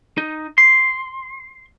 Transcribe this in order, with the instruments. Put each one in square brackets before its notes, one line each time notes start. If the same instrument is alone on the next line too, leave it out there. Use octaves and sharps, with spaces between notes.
[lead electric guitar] D#4
C6